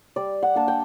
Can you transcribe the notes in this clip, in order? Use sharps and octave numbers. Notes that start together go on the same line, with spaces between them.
G3 D5
F#5
A#3 D4 A5
G5